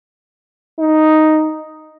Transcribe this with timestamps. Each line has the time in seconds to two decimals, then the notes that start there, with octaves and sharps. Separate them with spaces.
0.80 D#4